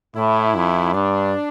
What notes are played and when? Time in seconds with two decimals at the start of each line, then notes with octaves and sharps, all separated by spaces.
0.16 A2 E4
0.55 F2
0.93 G2 D4